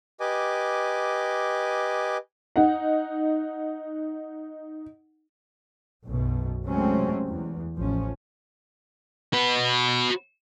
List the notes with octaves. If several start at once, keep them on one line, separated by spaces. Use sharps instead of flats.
G4 B4 D#5 G#5 D6
D#4 F#5
B1 F#2 B2
C3 F#3 G#3 A3 C4 C#4
E2
A1 F3 C#4
F#4 B4